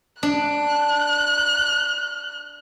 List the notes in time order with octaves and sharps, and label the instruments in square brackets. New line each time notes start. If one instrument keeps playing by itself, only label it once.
[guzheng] D4 [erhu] F#6